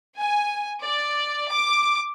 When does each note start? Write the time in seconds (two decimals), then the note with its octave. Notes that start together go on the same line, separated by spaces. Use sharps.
0.18 G#5
0.82 D5
1.51 D6